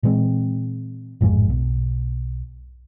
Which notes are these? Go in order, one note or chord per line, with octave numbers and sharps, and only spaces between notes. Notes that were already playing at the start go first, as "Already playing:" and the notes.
A#2 E3 G#3 C4
A1 F2 G#2 F3
B1